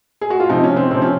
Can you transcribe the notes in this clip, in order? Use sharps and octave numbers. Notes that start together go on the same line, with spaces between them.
G#4
F#4
F4
C3 F3 D#4
C#4
C4
C3 F3 C4
C#4